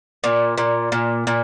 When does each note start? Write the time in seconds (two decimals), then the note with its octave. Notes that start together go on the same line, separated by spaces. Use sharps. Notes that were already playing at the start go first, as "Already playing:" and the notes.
0.24 A#2
0.58 A#2
0.92 A#2
1.27 A#2